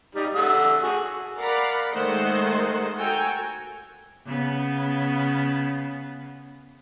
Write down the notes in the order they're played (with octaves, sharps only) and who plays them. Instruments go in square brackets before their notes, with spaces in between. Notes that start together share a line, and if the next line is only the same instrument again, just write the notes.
[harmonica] G3 D#4
A3 F#5 E6
F#4 G#4
[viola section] A#4 D5 F5 F#5 A#5 B5
D#3 G#3 A3 C5 D#5 F#5
F#4 A4 G5 G#5 A#5
[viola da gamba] C#3 B3